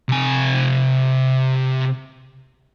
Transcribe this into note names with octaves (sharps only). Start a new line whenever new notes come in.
C3 G#5